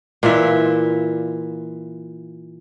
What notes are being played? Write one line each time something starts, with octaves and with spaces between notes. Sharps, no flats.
A#2 E3 F4 E5